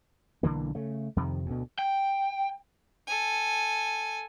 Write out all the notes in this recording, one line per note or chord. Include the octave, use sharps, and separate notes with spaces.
B1 D3 E3 A#3
C#3 A3
F2 C3 D#3
D2 B2
G5
A4 G#5